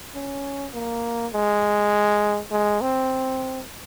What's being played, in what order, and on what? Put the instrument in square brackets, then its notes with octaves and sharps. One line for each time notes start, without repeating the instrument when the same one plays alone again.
[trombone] C#4
A#3
G#3
G#3
C4